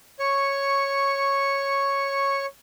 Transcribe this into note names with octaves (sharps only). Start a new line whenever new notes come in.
C#5 C#6